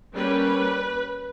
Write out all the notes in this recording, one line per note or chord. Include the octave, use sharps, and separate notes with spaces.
G3 A#3 C#4 B4